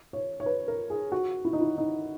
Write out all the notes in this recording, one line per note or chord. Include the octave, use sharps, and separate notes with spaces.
C#5
C#5
B4
A#4
G#4
F#4
E4
D#4
E4
D#4